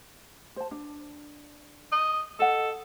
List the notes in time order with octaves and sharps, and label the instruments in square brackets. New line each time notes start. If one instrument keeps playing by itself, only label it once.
[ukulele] C5 A5
D4
[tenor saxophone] D#5
[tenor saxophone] A4 [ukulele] D#5 F#5